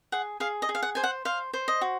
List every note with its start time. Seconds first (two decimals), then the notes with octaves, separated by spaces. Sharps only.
0.12 G#4 F#5
0.40 G#4 F5
0.62 D#5
0.69 G#4
0.75 F5
0.83 F#5
0.95 C5 G#5
1.04 F#5
1.25 C5 F5
1.53 C5
1.68 D#5
1.81 F#4